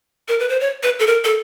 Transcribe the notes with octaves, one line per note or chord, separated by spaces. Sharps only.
A#4
B4
C5
C#5
B4
A4
A#4
A4